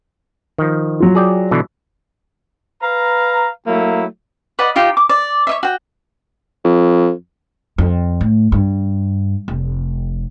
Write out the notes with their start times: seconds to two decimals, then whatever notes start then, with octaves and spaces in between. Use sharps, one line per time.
0.58 D#3 F3
1.00 F#3 F4
1.15 G#4 D5 G5
1.51 B2 D3 E3
2.82 B4 F5 A#5
3.67 F#3 A3 A#3 E4
4.59 B4 D5 D#5 F#5
4.76 D#4 F4 G4
4.97 D6
5.09 D5
5.47 C#5 D#5 E5
5.63 F#4 G5
6.64 F2
7.78 F2
8.21 A2
8.52 G2
9.48 F1